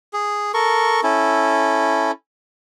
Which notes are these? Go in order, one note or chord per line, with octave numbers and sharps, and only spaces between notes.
G#4
A4 A#4 C#6
C#4 E4 A4